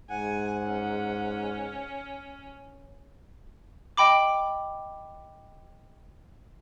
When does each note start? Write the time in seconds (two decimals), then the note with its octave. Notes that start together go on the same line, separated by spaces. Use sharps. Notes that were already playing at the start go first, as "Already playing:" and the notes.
0.11 G#2 F#5 G#5
0.66 C#4
3.97 D#5 G5 B5 D6